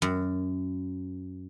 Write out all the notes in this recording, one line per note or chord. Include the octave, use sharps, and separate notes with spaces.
F#2